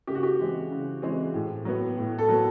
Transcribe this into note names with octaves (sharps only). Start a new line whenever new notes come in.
C#3 G4
F#4
G4
E3 G#3 C4
C#3
E3 G#3 C4
A2
F#3 B3
A2
A4
F#3 B3